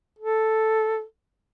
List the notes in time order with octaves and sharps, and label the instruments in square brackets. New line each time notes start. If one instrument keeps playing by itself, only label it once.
[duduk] A4